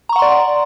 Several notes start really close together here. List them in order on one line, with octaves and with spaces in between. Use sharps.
A#5 C#6 F#5 C6 D5